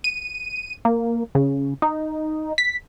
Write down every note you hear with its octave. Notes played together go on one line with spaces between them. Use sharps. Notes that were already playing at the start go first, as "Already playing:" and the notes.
D#7
A#3
C#3
D#4
B6